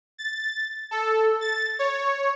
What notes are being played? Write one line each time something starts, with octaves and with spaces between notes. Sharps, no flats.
A6
A4
A6
C#5